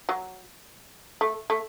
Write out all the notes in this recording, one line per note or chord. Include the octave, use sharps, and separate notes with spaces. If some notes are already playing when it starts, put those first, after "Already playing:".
F#3
A3
A3